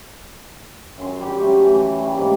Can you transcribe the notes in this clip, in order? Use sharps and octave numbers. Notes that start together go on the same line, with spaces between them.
F#2 G#5 C6
G3 G4 C#6
F#3 A3 C#4
E3
G3 A3
G#2 A#3